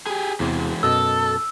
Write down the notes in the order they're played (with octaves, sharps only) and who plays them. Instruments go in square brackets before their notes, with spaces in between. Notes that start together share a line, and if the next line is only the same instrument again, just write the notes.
[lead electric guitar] G4 G#4
[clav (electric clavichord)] E2 C3 [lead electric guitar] E3 G#3
[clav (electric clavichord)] F#2 B2 D#5 [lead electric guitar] A4 [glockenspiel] E6